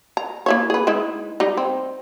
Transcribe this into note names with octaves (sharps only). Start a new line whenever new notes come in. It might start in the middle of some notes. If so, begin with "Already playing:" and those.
A#5
A#3 E4 C#5
G#4 B4
G#3 D#4 E4
G3 D#4
C4